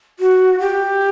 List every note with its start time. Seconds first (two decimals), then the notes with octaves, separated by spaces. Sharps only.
0.19 F#4
0.60 G4